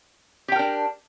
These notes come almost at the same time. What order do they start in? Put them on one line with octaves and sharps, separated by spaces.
G4 G5 A#4 D4